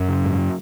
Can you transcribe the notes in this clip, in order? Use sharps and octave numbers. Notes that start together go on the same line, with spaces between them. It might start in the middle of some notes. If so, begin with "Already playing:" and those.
Already playing: F#2 F#3
C#3
G#2